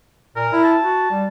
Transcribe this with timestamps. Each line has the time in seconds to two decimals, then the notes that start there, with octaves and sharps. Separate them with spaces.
0.36 A#2 A#4
0.52 E4
0.64 A5
0.83 F#4
1.11 G3